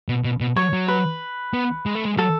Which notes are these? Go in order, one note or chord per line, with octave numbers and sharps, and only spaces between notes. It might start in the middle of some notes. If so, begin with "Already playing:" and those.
B2
B2
B2
F#3 C#5
F#3
B4
B3
G#3
A3
G#3
F#3 A4